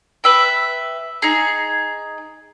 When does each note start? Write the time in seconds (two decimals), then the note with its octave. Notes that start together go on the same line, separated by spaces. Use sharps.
0.24 B4 E5 G5
1.22 D#4 G#4